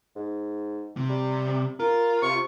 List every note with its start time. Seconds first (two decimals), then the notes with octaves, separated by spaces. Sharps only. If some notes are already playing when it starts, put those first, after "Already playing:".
0.16 G#2
0.97 C3
1.09 G3
1.80 F4 A#4
2.22 C3 C#6